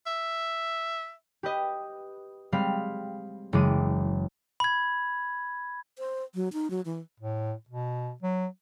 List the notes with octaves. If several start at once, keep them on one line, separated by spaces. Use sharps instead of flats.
E5
G4 B4 D#5
G3 G#3 C4 F5 B5
F#1 E3 G#3 D6 D#7
B5 G#6
C5
F#3
D#4
F#3
E3
A2
B2
F#3